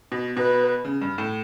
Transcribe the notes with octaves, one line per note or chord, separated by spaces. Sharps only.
B2
B2 B4
C#3
G2
A2